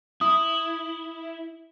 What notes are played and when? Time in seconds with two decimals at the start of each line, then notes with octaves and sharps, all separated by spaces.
0.21 E4 D#6